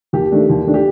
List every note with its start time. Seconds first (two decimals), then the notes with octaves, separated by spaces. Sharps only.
0.13 D#2 G4
0.31 D#3 A3 D4
0.50 D#2
0.67 D#3 A3 D4
0.74 G4